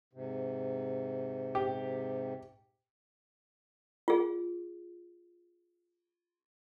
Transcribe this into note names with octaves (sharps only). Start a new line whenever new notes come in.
G#2 C3
G4
F4 G#4